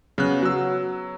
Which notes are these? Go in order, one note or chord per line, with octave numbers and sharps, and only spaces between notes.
C#3 F#3 B3 F#6
F#3 F#4 E6